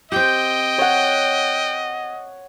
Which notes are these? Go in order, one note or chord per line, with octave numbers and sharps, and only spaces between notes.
C4 G4 D#5 G5
C#5 F#5